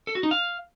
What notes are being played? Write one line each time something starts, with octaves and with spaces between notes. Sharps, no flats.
A4
F#4
D#4
F5